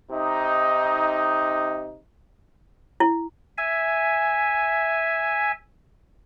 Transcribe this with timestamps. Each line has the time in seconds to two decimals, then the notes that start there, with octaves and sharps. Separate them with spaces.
0.11 C3 D#4
3.00 E4
3.58 E5 G#5